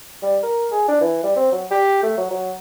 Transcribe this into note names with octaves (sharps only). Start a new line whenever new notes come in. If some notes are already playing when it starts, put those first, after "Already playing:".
G3
A#4
G#4
D4
E3
G3
C4
F#3
G4
A3
F#3
F#3